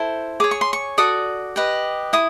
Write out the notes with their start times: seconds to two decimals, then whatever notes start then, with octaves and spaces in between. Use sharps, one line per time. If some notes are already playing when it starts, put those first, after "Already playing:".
Already playing: E4 A4 C5
0.40 G#4 C#5 D6
0.51 C#6
0.61 C6
0.73 C#6
0.98 F#4 A4 D5 D#6
1.56 G4 B4 D#5
2.13 E4 D#6